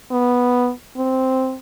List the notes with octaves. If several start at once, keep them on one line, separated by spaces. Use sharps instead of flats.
B3
C4